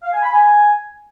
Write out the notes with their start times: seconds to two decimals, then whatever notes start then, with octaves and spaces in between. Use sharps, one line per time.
0.03 F5
0.13 G#5
0.22 B5
0.32 G#5